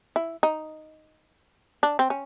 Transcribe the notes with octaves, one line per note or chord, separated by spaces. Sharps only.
E4
D#4
D4
C4
C#4